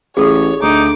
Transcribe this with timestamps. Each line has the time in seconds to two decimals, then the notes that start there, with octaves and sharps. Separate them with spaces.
0.17 A1 G#4 A4 C#5
0.63 D2 D#4 D6